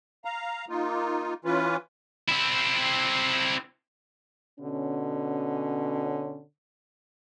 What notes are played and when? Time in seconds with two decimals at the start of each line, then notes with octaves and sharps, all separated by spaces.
0.25 F5 A#5
0.69 A#3 D#4 F4
1.45 E3 C#4 F4 B4
2.28 C4 E4
4.60 B2 D3 C#4